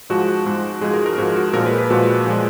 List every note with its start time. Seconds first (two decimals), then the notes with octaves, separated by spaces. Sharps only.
0.10 G#2 F3 G#3 F#4
0.46 G#2 F3 G#3
0.81 G#2 F3 G#3 G#4
0.93 A#4
1.06 A#4
1.18 G#2 F3 G#3 F#4
1.36 F#4
1.53 A#2 F3 G#3 A#4
1.66 B4
1.78 B4
1.90 A#2 F3 G#3 F#4
2.26 A#2 F3 G#3